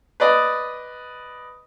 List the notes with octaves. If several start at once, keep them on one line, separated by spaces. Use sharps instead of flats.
B4 D5 D#5